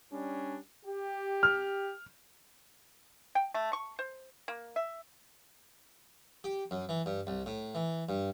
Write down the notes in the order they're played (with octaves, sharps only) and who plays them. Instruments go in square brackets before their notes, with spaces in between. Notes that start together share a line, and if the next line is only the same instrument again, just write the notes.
[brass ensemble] G3 C#4 D4
G4
[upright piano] F6
[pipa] G5
A3
C#6
C5
A#3
E5
[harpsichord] G4
F#2
E3
G2
C2
A2
E3
G2